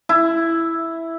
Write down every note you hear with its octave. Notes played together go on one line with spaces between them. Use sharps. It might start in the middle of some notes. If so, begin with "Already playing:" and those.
E4